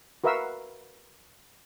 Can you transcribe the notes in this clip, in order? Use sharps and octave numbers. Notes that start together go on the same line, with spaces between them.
F#4 A#4 B4 E5 F5 E6